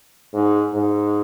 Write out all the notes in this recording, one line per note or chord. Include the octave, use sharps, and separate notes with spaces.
G#2
G#2